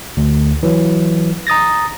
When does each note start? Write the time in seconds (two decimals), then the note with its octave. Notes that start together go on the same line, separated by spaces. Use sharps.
0.17 D2
0.63 E3 F#3
1.47 A#5 D#6 A6 A#6